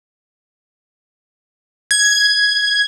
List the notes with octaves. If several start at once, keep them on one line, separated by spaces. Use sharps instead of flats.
G#6